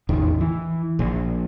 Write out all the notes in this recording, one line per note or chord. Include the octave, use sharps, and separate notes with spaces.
A1 E2 D#3
E3
A#1